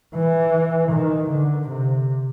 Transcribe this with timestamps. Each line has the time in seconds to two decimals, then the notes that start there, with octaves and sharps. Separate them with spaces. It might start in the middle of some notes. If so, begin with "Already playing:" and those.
0.15 E3
0.91 D#3
1.30 D3
1.69 C3